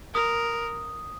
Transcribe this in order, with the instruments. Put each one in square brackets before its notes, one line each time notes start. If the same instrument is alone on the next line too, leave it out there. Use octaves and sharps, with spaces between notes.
[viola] A#4 [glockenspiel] D#6